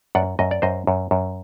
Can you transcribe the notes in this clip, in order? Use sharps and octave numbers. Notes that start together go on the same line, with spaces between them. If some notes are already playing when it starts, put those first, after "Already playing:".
F#2 D5 F#5
F#2 D#5
D5
F#2 C5 D#5
F#2
F#2